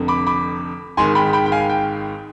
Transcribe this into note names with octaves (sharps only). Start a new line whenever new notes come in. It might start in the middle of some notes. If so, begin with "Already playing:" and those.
Already playing: F1 F2 D3
B5 D6
B5 D6
G#1 G#2 D#3 G#5 C6
G5 B5
G5 B5
G5
F5 G#5
G5